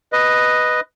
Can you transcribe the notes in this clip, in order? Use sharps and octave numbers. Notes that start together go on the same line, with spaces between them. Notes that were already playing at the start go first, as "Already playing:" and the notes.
B4 D#5